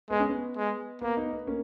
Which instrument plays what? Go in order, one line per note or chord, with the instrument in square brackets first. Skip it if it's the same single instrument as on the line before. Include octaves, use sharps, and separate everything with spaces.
[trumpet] G#3 [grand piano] B3
[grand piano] C#4
B3
[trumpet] G#3
[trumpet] A#3 [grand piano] B3
[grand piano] B3 D#4
B3
A#3 C#4